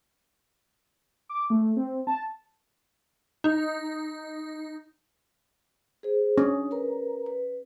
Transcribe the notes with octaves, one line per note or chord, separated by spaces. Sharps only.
D6
A3
C4
A5
D#4
G#4 C5
C#4 D4 D#6
A#4 B4 A#5
B4